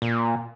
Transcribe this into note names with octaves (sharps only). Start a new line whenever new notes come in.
A#2